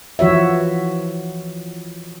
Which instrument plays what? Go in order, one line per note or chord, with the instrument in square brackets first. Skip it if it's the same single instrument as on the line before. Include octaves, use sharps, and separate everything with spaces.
[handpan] E3 F3 F#4 C#5 E5